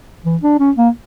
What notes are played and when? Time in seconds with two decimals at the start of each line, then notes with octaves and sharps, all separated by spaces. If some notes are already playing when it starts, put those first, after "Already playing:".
0.25 E3
0.42 D4
0.59 C#4
0.77 A#3